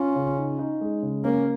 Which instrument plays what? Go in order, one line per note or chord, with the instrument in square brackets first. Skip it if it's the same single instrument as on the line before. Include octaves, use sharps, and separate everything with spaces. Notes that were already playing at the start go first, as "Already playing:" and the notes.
Already playing: [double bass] C#4 [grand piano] F4
[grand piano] C#3
D#4
D#4
G#3
C#3
[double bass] A#3 [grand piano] C#4